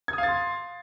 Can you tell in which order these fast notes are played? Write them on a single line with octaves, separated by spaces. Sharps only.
G#6 D#6 F5 A6 C6